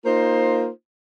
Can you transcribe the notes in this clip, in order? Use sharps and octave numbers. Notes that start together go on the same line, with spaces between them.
A#3 D#4 F4 C5